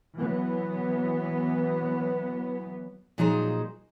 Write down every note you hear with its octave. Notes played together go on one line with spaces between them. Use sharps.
E3 F#3 B3
A#2 F3 F#3 D#4 G#4 C5